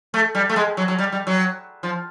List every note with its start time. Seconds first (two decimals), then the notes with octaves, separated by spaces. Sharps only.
0.14 A3
0.35 G3
0.50 A3
0.56 G#3
0.77 F#3
0.88 F#3
0.99 G3
1.12 G3
1.27 F#3
1.83 F3